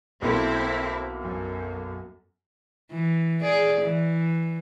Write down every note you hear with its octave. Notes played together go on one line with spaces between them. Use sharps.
B1 A#3 C4 E4 A4
F#2
E3
G#4 D5
E3